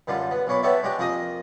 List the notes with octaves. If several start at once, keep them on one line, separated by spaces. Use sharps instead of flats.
F#2 D3 G3 F4
B3
B1 A#2 C#5 B5 D6
B3 G4 A4 C#5 D5 E5
G#3 D4 G4 G5
F2 A#3 G#4 A#4 D#5 D#6